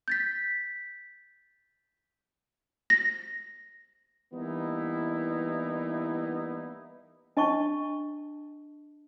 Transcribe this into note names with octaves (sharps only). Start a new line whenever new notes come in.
G6 A6 B6
A#6
E3 G3 A#3 B3 D#4 E4
D4 D#5 A5 C#6